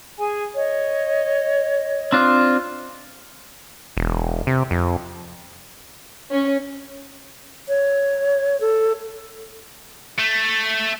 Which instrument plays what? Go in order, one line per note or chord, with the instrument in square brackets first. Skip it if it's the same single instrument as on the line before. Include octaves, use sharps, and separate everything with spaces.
[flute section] G#4 G#5
C#5 D#5
[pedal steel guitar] C4 D4 F4
[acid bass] E1
C3
F2
[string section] C#4
[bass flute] C#5
A4
[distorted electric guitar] A3